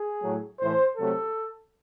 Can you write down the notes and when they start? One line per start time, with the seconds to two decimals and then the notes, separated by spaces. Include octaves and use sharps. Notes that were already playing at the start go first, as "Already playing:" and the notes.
Already playing: G#4
0.22 A2 F#3 A3
0.60 A2 E3 A3 C5
0.97 C3 F#3 A3 A4